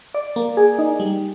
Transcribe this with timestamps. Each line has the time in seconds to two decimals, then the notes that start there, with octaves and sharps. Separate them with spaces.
0.14 D5
0.36 A#3
0.57 G#4
0.79 D#4
1.00 G3